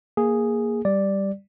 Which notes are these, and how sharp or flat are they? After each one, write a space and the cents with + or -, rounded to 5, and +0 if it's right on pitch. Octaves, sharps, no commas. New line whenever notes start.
A#3 +0 G#4 +0
G3 +0 D5 +0